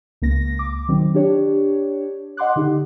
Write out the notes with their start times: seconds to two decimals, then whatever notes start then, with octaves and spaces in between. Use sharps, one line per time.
0.22 C#2 A#3 A#6
0.59 D6
0.88 D#3 F#3 C4
1.15 D4 G4 C#5
2.37 D#5 F#5 C6 D6 F#6
2.56 D3 D#4 G4